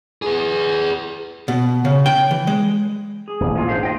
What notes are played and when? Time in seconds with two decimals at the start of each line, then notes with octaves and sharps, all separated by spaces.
0.22 G#4 B4
1.48 B2
1.85 C#3
2.06 G5
2.31 E3
2.47 G#3
3.28 G#4
3.40 D#1 A1
3.55 A#3 F4
3.69 G#2 D3 C5 F5
3.83 F4 D#5 G5